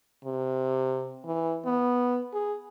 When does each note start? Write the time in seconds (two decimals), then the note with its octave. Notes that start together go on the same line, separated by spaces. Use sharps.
0.24 C3
1.25 E3
1.65 B3
2.33 G#4